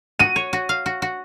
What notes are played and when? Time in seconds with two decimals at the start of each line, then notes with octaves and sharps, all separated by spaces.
0.19 F#4 D#7
0.36 C#5
0.53 F#4
0.69 F5
0.86 F#4
1.02 F#4